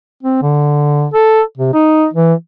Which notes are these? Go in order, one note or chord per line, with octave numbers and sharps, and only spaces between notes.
C4
D3
A4
C3
D#4
E3